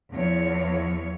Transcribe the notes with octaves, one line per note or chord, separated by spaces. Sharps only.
E2 F3 C#5